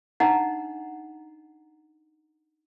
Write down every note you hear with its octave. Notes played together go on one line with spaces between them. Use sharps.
D4 D#4 D#5 F#5 A#5